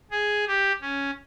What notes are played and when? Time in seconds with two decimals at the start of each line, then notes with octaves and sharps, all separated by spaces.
0.11 G#4
0.47 G4
0.81 C#4